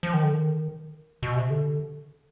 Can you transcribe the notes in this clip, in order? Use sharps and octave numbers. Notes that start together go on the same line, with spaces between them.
F3
D#3
D3
D#3
B2
C3
D3